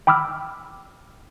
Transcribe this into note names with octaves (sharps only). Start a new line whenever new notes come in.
G5 B5 D6 E6 F6